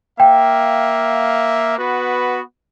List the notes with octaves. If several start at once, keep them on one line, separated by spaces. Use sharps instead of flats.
A#3 E5 F5 G5
B3 F#4 B4